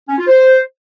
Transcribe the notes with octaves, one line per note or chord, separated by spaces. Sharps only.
C#4
F4
C5